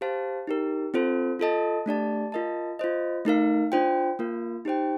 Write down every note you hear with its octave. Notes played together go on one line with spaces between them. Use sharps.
G4 C5 F5 A5
D#4 G4 A#4
C4 F4 A4 C5
F4 A4 D#5 A5
A3 D4 G4 D5 A5
F4 A#4 D#5 A5
F4 C5 D#5
A3 D#4 A#4 F5
D4 F4 C5 G5
A#3 F4 A#4
D#4 G4 C5 G5